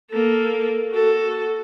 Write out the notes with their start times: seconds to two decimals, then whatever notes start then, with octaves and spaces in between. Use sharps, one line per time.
0.10 A#3 A4
0.92 F#4 A4